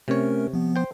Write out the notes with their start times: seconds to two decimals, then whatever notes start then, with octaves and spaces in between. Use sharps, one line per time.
0.08 C3 A3 C#4 A#4 C#5
0.53 F3 B3
0.76 C5 G5